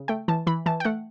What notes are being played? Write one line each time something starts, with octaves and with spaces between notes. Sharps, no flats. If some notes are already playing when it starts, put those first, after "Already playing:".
Already playing: C#3
A3 G5
E3 A5
E3 B5
E3 A5
G5
A3 F#5